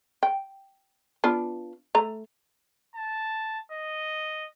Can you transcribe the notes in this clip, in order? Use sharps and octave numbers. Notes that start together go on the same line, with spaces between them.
G5
B3 D4 F4
A3 A#5
A5
D#5